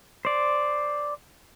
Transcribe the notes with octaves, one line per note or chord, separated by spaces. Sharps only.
C5 D5